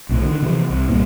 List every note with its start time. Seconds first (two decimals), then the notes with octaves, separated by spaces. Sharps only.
0.09 B1 A2
0.23 D3 D#3
0.42 C3 E3 F3
0.70 C2
0.88 C2 G2 A#2